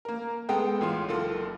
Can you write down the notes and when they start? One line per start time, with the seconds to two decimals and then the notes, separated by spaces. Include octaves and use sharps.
0.05 A#3 A#4
0.49 G#3 B3 A4 G5
0.81 A1 F4 C6
1.09 F#1 F4 A4